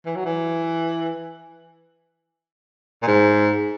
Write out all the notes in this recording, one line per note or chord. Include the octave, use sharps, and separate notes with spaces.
E3
F#3
E3
A#2
G#2